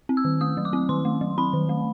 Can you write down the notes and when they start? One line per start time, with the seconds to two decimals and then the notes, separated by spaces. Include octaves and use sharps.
0.09 C4
0.17 E6
0.25 D#3
0.41 A3 D#6
0.57 F#3
0.65 D6
0.73 C4
0.89 D#3 C6
1.05 A3
1.21 F#3
1.38 C4 B5
1.53 D#3
1.69 A3